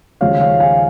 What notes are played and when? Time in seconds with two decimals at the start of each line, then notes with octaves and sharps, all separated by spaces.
0.21 D#2 C#3 F3 G#3 C#5 F5
0.41 C#5 F5
0.60 F5 G#5